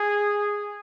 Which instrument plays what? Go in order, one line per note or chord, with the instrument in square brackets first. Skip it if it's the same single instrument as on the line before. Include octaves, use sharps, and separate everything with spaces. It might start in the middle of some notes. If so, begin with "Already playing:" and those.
Already playing: [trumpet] G#4